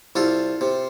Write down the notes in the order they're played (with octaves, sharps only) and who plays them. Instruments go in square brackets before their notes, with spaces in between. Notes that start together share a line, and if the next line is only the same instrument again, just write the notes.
[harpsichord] C2 F4 A4
C3